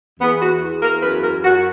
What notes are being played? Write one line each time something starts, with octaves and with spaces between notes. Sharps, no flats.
E2 B3
F#4
E2
A#4
F#2 B4
A#4
F#2 F#4